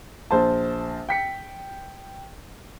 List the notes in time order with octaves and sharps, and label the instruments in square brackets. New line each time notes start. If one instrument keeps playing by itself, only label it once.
[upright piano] A#1 C5 A5
G5 B6 C#7